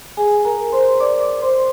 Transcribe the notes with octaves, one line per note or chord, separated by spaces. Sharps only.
G#4 G#5
A#4 A#5
C5 C6
D5 D6
D5 D6
C5 C6